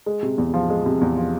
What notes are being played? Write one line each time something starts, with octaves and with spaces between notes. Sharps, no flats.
G#3
C3
E2
F3
G#3
C3
E2
F3